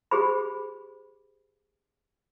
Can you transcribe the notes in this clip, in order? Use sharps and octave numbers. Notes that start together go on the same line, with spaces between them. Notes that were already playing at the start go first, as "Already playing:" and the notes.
G4 G#4 C5 B5